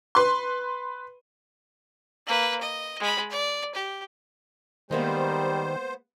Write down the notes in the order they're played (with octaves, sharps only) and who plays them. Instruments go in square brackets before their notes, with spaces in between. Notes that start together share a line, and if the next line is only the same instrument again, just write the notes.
[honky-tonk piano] B4 C6
[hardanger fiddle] A#3 B4
D#5
G#3 B5
D5
G4
[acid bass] D#3 [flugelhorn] G3 [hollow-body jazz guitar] G#3 A#3 B3 [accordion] C5